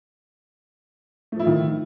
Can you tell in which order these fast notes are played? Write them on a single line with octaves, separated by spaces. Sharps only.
A3 F3 E4 F4 D#3